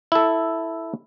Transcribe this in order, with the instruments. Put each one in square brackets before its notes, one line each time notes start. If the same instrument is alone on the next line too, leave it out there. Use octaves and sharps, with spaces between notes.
[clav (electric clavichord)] E4 A4